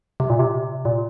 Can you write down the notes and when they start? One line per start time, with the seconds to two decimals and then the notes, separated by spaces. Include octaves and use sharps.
0.20 C3
0.30 A#2
0.39 C3
0.85 A#2